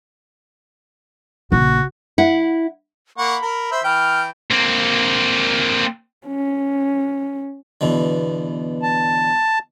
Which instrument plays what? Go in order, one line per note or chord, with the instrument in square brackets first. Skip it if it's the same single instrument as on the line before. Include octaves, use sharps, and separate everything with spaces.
[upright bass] A#1 C#3 [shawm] F#4
[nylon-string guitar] E4 F#5
[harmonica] A#3 F#5 C#6 [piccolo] B5
[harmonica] A#4
C5 E5
[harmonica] E3 G5 [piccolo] F6
[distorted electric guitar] A#3 C4
[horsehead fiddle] C#4
[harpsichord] E2 B2 D3
[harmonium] A5